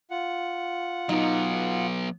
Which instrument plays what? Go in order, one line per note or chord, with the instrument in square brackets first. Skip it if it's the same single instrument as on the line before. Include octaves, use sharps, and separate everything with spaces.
[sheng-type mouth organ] F4 F#5
[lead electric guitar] F#3 B3 [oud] D#4